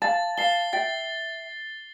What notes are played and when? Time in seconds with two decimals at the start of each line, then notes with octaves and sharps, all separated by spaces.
0.02 F5 A5 A6
0.38 F5 A5 C7 G7
0.73 E5 G5 A6